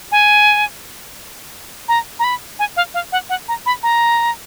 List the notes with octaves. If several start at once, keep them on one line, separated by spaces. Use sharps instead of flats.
G#5
A#5
A#5
B5
G#5
F5
F5
F#5
F#5
A#5
B5
A#5